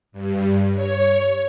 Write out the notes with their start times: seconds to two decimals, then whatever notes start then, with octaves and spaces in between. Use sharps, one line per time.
0.12 G2
0.73 C#5